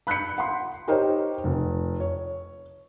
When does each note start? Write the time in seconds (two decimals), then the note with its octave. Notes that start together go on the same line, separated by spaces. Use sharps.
0.07 B5 F#6 G6 B6 C#7
0.38 F#5 C6
0.88 D#4 G4 A#4 C5 C#5 D#5
1.44 F1
2.00 C#5